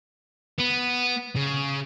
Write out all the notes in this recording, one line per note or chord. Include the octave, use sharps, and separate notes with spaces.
B3
C#3